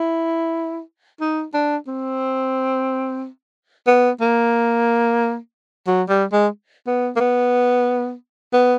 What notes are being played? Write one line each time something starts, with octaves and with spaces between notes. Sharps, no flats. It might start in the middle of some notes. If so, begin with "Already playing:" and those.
Already playing: E4
D#4
D4
C4
B3
A#3
F#3
G3
G#3
B3
A#3
B3
B3